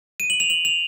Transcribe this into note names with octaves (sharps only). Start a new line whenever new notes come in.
D#7
F#7
F7
F#7
F7